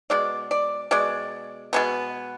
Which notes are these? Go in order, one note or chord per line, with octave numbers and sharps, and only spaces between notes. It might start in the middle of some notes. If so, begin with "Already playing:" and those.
B2 G#3 D5
D5
B2 G#3 D5
B2 G#3 B3